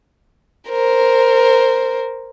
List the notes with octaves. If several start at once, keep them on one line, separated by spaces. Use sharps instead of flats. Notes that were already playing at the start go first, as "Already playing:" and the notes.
A#4 C5